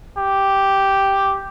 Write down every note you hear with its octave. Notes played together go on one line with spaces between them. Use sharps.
G4